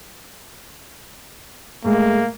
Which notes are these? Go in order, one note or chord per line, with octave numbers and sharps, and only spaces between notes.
A2 G#3 A#3